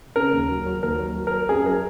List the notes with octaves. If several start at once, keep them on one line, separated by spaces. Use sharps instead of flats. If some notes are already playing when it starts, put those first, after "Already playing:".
C#3 A#4
D#2
F#3
F#3
D#2 A#4
F#3
F#3
A#4
F#3
F#2 G#4
F#3 A#4